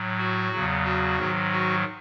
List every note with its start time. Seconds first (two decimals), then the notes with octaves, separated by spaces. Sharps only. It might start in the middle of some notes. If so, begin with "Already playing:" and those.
Already playing: A2 F#3
0.18 F#4
0.52 E2 C#3 F#3
0.85 F#4
1.18 G#2 D#3 F#3
1.52 F#4